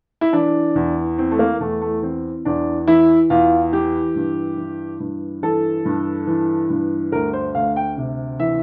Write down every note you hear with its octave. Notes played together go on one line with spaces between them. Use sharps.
E4
E3 D4
E2
E3 C4
A3
A#3
E2 A3
A3
E3 C4
E2 D4
E3 E4
E2 F4
E3 G4
G2
E3
G2
E3 A4
G2
E3
G2
D2 A#4
C5
D2 F5
G5
C3
E3 E5